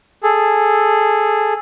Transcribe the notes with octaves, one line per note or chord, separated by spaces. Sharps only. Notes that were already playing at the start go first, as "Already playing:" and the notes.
G#4 A4